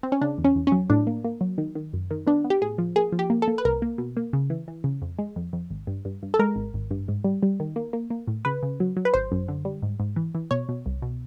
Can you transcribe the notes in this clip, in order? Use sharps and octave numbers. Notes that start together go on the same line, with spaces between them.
C4
C#4
C#3 D4
E2
C#4
E2
C#4
F#3
A2 D4
A#3
A#3
F#3
D#3
D#3
F#2
D#3
B3 D4
B3
G4
A2 G#4
F3
A#3 G#4
F3
G4
A#3
A4
A#3
B4
C2 A#4
A#3
B2
A#3
C#3
E3
E3
C#3
F2
G#3
F2
F2
G#1
G2
G2
G2
A4
G#3 A#4
G#1
G#1
G2
G#2
G3
G3
D#3
A#3
A#3
A#3
A2
C#3 B4
C#3
F#3
F#3
B4
G#1 C5
F#2
D3
G3
G#2
G#2
E3
E3
B2 C#5
B2
C2
B2